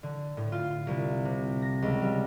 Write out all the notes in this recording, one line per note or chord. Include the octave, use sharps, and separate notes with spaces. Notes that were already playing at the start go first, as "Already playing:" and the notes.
D3
A2
F4
C2
C3
A#6
C#2
G3